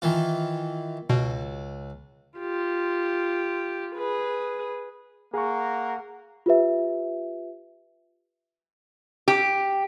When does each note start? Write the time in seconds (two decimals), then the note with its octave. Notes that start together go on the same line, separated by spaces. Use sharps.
0.02 D#3 E3 F4
1.10 C#2 B2
2.38 F4 G4
3.95 G#4 B4
5.34 A#3 G#4 F#5 A#5 C#6
6.46 F4 G4 B4 E5
9.28 G4